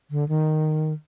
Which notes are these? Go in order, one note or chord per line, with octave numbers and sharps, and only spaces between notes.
D3
D#3